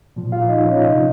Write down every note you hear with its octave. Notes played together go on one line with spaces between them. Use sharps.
A#2 F3
F4 F5
D#4 D#5
C#4 C#5
C3 F3 D#4 D#5